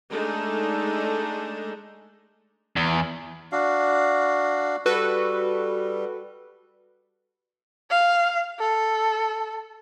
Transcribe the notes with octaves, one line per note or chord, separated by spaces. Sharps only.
G#3 A3 D4 D#4 A4
E2
D4 F#4 F5
G3 F#4 A4 B4
F5
A4